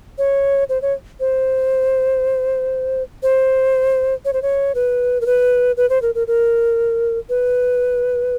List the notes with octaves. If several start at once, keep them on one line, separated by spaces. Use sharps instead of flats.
C#5
C5
C#5
C5
C5
C#5
C5
C#5
B4
A#4
B4
B4
C5
A#4
A#4
A#4
B4